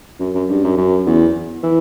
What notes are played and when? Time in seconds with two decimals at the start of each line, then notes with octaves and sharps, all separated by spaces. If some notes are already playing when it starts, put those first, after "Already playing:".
0.20 F#2
0.34 F#2
0.49 G2
0.64 F#2
0.77 F#2
1.06 E2
1.63 E3